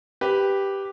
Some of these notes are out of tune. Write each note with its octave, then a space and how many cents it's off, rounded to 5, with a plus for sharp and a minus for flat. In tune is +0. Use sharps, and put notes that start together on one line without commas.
G4 +0 B4 +0